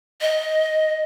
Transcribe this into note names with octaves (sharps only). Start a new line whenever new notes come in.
D#5